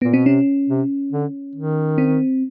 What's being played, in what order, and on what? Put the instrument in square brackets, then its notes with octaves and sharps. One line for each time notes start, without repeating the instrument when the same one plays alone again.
[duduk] A#2 [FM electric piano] B3
[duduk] B2 [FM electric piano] C4
[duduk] C3 [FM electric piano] C#4
[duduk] C3
D3
D#3
[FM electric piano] C4